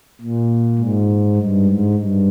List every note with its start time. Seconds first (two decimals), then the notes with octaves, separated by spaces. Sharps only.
0.21 A#2
0.78 G#2
1.36 G2
1.65 G#2
1.94 G2